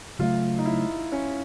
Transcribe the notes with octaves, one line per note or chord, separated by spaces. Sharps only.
C#3 F#3 A3 F4
D#4
E4
C#4